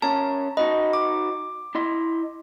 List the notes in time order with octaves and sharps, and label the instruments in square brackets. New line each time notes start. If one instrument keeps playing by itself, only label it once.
[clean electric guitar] C#4 A#4 [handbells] A5
[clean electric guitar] D#4 F#4 B4 [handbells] D#5
[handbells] D6
[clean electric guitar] E4 D#5 C6